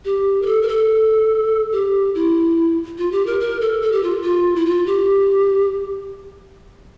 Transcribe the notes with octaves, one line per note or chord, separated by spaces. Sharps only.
G4
A#4
A4
A#4
A4
G4
E4
F4
G4
A#4
A#4
A4
A4
G4
F4
F4
E4
F4
G4